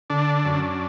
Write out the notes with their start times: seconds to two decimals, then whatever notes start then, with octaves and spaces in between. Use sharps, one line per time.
0.10 D3 D4
0.45 F#2